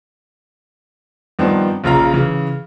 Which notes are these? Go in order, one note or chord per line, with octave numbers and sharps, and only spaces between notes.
G2 D#3 F3 B3 C4 D4
A#1 C#3 F4 A#5
C#3 E3